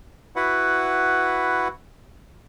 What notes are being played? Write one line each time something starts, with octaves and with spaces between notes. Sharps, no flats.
E4 F#4 B4 F#5